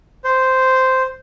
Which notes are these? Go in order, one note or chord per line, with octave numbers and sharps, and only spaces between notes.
C5